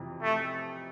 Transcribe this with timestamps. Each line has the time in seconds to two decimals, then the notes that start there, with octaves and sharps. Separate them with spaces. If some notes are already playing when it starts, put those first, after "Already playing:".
Already playing: F2 C3 E3
0.22 A3